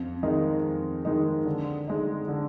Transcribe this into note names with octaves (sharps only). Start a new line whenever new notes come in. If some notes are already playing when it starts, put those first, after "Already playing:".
Already playing: F2
D#3 G#3 D#4
F2
D#3 G#3 D#4
D3
G#3 D#4
D3